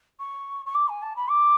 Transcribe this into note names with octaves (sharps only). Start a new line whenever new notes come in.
C#6
C#6
D6
G#5
A5
B5
D6